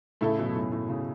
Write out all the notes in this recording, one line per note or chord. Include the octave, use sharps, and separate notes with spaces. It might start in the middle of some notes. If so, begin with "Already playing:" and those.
A2 C#3 A3 E4 A4
F#2 B2
A2
A2
A2 C#3